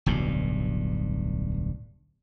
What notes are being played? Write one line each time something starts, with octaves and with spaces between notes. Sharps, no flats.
D1 B1 G2